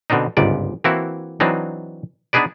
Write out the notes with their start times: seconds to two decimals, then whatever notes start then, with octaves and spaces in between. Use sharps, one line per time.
0.10 B2 D3 C4 D4 D#4
0.37 G1 C#2 G#2 D5
0.84 E3 A#3 C4 E4 F#4
1.40 E3 F#3 C4 D4 D#4
2.33 B3 D4 D#4 G#4 B4 D5